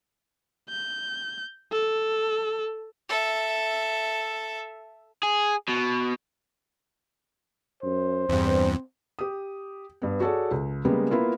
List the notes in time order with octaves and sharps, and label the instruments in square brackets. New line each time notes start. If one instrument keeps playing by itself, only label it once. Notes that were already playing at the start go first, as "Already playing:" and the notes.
[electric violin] G6
A4
[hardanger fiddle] A4 E5
[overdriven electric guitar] G#4
B2
[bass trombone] F#2 [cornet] C5
[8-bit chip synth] E2 G2 [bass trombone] C4
[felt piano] G4 D#6
G2 B3
F#4 G#4 A4 C#5 D5
C#2
C#3 G3 G#3 A#3 B3
A#3 B3 E4 F4 A#4